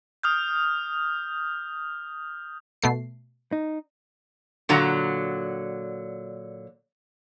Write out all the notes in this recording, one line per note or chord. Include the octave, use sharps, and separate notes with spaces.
D#6 F6 G6
B2 A3 C7
D#4
A#2 D3 F#3 A#5